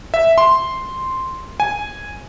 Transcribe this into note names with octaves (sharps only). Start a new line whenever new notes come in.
E5
C6
G#5